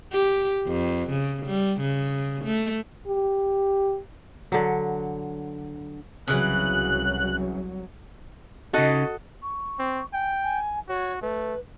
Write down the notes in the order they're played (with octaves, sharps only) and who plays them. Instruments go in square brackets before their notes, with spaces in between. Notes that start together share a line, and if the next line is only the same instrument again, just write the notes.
[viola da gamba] G4
F2
C#3
G3
C#3
A3
[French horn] G4
[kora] D3 F#3
[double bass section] C2 F#3 [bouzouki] C#3 E3 [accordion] F#6
[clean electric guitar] C#3 D#4 [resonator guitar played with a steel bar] F#4 A4 D#5
[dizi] C#6
[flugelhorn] C4
[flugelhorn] G5 [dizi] G#5
[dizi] G#5
[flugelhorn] F#4 [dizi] C#5
[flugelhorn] A3 [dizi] B4